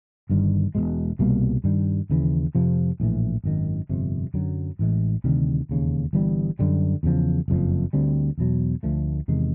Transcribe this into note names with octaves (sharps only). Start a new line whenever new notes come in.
G1 G2 D#3 G3
E1 E2 B2 G#3
C2 B2 G3 A#3
G2 D#3 G3
D#2 C#3 E3
F2 C3 F3
A#1 A2 E3
G#1 F#2 D#3
G1 F2 C3
F#2 D3 F#3
A1 A2 E3 G#3
D2 C3 D#3 G3
E1 D#2 C#3
G1 G2 E3 G3
F#2 D3 G3
E2 C#3 F3
F#1 F2 C3 F3
D2 D3 G3 C4
E2 B2 F#3
D2 D3 F3 A3
E2 C3 D#3 G#3